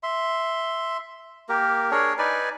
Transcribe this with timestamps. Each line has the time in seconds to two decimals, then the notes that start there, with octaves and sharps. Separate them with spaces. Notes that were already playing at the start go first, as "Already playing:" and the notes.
0.03 E5 C6
1.49 A#3 G4 A#4
1.91 D4 G#4 A#4 C#5
2.18 D#4 B4 D5 G#5